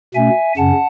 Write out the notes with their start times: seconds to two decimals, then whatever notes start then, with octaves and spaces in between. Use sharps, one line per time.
0.14 B2 A3 C#4 E5 G#5
0.57 F#2 C#3 C#4 F#5 A5